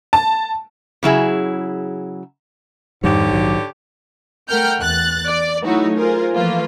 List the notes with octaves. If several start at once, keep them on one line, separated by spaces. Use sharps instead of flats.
A5
C#3 F#3 E4 G#4
F2 G#2 D3 D#3 G3 G4 C#5
A#1 D#3 F#3
A3 A#4 F#5 G5 F6 G6
E2 F#6 A6
D5
F#3 A3 D#4 E4 F#4 C#5
F4 G#4 A#4 C5
E3 F3 A3 A#3 F4 B4